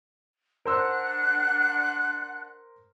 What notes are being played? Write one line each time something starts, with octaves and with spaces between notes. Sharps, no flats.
D4 A#4 C5 F#5 E6 F#6